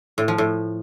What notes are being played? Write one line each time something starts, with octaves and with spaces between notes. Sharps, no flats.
A2
F3
A2